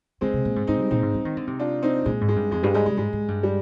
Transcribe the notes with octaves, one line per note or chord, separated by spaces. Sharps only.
D3 G#3 C4
C3
A#2
G#2
G#2 C4 D#4
G3
A#2 C4 D#4
G#2
G3
D#3
D3
C3
D4 F4
C4 D#4
A#2 G#3
G#2
G#3
G2
F2 G#3
G2 G3
G#2 G#3
C3 G#3
G#2 G#3
G#2
G2
G3